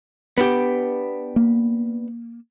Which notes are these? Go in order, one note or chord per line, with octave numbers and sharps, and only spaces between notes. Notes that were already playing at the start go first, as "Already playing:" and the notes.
B3 D4 G4
A#3